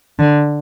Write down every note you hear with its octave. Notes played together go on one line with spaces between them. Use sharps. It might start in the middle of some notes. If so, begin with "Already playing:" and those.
D3